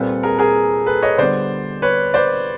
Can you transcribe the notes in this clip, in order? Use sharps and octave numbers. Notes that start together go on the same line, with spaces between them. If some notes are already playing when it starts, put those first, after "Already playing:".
Already playing: A#2 G3 C4 A4 B4
G#4 A#4
G#4 A#4
A4 B4
C#5 D#5
D3 G3 B3 C5 D5
B4 C#5
C5 D5